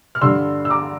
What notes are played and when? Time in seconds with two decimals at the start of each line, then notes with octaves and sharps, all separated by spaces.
0.15 F6
0.21 G2 D3 G3 D4 C6 E6
0.65 E6
0.70 A#5 D6